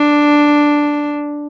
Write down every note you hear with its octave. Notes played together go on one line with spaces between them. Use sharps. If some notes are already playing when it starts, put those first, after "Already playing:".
Already playing: D4